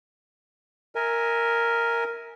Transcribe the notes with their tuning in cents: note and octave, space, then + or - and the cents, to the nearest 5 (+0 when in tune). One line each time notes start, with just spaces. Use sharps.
A#4 +0 E5 -25 G#5 +0